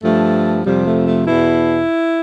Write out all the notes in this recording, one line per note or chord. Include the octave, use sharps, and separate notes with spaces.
G2 F3 A3
F2 C3 F3 G3
A3
A3
E2 B2 E4